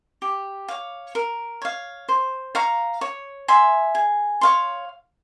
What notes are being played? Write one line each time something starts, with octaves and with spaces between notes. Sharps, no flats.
G4
C#5 F5
A#4
C#5 F5
C5
F5 A#5 C#6
C#5
E5 G#5 C6
G#4
C#5 F5 C6